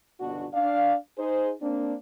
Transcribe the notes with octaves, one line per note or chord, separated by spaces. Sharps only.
G1 C#2 B2 D4 F#4
D4 D5 F5
D#4 G#4 C5
A#3 C4 D4